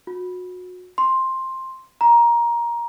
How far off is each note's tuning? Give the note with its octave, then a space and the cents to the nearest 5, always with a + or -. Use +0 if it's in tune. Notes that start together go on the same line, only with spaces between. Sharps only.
F#4 -30
C6 +5
A#5 +15